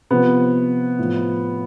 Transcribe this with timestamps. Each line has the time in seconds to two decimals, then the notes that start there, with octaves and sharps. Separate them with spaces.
0.10 C3 F3 B3
0.99 A2 F3